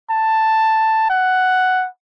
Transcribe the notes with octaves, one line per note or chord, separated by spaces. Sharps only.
A5
F#5